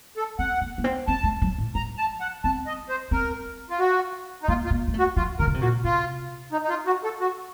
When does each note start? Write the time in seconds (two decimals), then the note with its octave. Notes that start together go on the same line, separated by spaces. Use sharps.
0.17 A4
0.39 C4 F#5
0.61 A#3
0.78 A#3
0.84 C4
1.07 C4 A5
1.24 A3
1.42 F#3
1.58 A2
1.75 F3 A#5
1.98 A5
2.21 F#5
2.44 C4 A5
2.66 D#5
2.89 C5
3.11 C4 A#4
3.70 F4
3.80 F#4
4.43 D#4
4.48 A#3 F4
4.65 F4
4.71 A#3
4.88 A#3
4.94 A3
4.99 F#4
5.16 F3 F4
5.39 D#3 A#4
5.47 C#3
5.54 C3
5.61 A#2 F#4
5.84 C3 F4
6.52 D#4
6.63 D#4
6.69 F4
6.87 F#4
7.04 A4
7.20 F#4